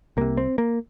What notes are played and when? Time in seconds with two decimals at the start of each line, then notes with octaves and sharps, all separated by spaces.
0.17 C2 C3 A#3
0.37 C4
0.58 A#3